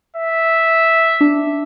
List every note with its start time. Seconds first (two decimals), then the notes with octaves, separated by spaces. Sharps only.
0.16 E5
1.21 D4